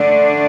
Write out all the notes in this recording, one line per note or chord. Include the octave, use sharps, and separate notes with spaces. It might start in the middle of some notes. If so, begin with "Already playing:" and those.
Already playing: D3 A3 D4